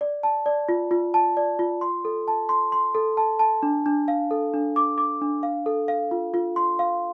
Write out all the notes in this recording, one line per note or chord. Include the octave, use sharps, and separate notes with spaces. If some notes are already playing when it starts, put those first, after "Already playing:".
D5
A5
D5
F4
F4
A5
D5
F4
C6
A4
A5
C6
C6
A4
A5
A5
D4
D4
F5
A4
D4
D6
D6
D4
F5
A4
F5
F4
F4
C6
F5